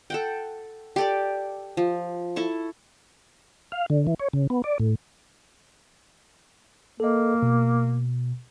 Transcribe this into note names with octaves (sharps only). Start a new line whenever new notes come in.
A4 F#5 G5
G4 A4 D5
F3
E4 A4 C#6
F5
D3
E3
C#5
C#3
B3
D5
A2
A#3 A4 D#5
B2